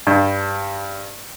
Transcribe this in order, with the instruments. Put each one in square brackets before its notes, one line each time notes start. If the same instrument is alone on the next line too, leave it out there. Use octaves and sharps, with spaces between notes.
[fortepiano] G2